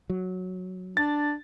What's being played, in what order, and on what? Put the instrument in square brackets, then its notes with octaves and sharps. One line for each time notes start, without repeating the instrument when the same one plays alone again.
[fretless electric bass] F#3
[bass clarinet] D4 [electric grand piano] A6